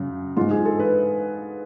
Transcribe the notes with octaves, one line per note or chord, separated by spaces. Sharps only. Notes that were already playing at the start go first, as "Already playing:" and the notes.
Already playing: F#2 C#3
G#2 F4
G#4
A4
B4